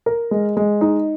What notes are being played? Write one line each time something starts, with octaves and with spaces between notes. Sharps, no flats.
A#4
G#3
G#3
D#4